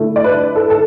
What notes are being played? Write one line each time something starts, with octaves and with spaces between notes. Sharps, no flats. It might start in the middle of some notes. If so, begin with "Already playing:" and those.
Already playing: D3 A3 E4
D5
B4
A4
A4